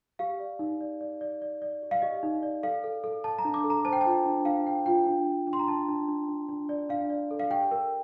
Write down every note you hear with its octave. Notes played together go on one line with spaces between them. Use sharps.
G4 F5
D5
D#4
D5
D5
D5
D5
D5
G4
F5
G4 D#5
D#4
D5
A4 F5
A4
A4
A4 A5
A#5
D4
D6
A4
A#5
C5 A5
G5
F4 A5
D4
D4 F5
D4 G5
F4 G5
D4
D4
D4
C6
A#5
D4 A5
D4
D4
D4
D4
D5
D4 F5
D5
A4
F5
G4 G5
A#4